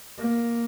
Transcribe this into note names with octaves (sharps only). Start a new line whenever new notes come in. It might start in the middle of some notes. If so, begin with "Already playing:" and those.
A#3